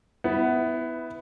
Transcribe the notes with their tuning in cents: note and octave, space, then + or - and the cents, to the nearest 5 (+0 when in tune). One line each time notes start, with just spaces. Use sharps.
B3 +15 E4 -10